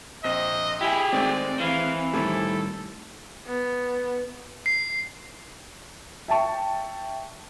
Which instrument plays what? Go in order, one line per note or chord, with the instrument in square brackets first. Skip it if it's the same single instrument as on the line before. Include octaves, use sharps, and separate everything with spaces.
[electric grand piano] A#1 C4 A#6 [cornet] D#5
[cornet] E4 [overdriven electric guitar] G4 G#4
[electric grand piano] D#3 G#3 A3 [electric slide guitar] C4 [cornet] D5
[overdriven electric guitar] E3 [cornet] F5
[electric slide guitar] A2 D#3 G3 [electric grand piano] C4 E4 G4 [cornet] A4
[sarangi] B3
[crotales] C7
[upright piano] E5 G5 A5 C#6